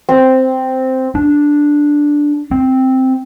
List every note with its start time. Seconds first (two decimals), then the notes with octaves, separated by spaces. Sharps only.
0.09 C4
1.15 D4
2.51 C4